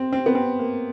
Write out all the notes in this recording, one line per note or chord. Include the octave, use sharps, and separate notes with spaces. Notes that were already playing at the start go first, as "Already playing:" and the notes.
Already playing: C4
C4
B3
C4
A#3